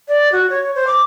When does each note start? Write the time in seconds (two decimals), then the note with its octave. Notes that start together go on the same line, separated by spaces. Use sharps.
0.08 D5
0.32 F#4
0.50 C#5
0.75 C5
0.87 D6